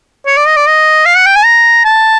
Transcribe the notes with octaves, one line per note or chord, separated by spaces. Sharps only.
C#5
D5
D#5
D5
D#5
F5
F#5
G5
G#5
A#5
A5